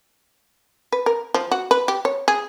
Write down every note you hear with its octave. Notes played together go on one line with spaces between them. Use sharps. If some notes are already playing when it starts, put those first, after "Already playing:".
B4
A#4
F3
F#4
B4
G4
C#5
G#4